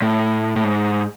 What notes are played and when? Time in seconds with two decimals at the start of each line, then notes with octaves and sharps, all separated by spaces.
0.02 A2
0.56 A2
0.64 G#2